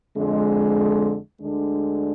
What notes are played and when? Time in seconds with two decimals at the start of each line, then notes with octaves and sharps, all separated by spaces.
0.16 F2 D3 G#3
1.41 D2 D3 G#3 D4